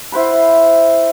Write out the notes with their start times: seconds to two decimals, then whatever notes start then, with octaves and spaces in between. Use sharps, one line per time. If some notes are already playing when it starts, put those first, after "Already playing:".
0.12 E4 C5 F#5 B5